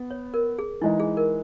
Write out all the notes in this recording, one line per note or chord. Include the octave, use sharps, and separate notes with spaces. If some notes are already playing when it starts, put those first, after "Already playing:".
Already playing: B3
C#5
A#4
G#4
E3 G#3 D#4 E4
G#4
A#4